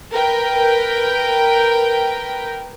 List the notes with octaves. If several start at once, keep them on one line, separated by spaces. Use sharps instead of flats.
A#4 B4 G5